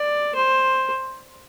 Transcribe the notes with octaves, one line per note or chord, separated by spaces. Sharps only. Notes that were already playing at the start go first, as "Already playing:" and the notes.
Already playing: D5
C5